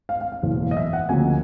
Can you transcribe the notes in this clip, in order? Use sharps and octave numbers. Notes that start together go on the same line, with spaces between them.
F5
F5
F5
F#1 E2 B2
D#5
E5
F#5
D2 C#3 F3 A#3 G#5